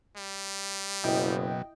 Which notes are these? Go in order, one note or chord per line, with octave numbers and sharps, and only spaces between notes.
G3
F#1 B2 F#3 E4 D#5 G5